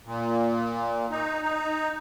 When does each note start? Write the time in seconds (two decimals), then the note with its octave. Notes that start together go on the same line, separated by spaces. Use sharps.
0.05 A#2
1.11 D#4
1.42 D#4